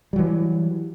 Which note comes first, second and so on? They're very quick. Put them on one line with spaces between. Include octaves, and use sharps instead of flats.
G3 F#3 E3